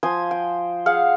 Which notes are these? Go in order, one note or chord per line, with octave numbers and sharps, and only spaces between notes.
F3 C5 G#5 D#6
G5
G#4 F5 F#5